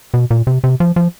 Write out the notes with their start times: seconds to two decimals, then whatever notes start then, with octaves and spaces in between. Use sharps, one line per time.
0.14 B2
0.31 A#2
0.47 C3
0.64 C3
0.80 F3
0.96 F3